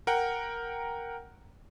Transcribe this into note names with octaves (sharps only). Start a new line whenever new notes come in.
A#4 F#5 G5